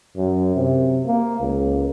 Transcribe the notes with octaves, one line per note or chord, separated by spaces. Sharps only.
F#2
C3
A#3
C#2